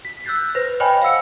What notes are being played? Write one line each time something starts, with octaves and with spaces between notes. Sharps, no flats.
B6
E6 F#6 G6 A6 C7
B4 C5 A#6
C5 C#5 D#5 G5 G#5 B5
F5 F#5 E6 C#7